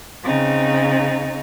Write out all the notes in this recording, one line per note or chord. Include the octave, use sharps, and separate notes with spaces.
C#3 C4 D#4